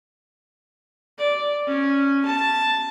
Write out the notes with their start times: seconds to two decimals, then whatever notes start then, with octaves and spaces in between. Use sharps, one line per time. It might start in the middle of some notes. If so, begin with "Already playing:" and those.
1.18 D5
1.67 C#4
2.25 A5